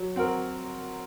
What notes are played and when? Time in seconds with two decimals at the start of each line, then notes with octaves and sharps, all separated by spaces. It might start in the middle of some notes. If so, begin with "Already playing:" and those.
Already playing: F#3
0.16 C4 F#4 A#4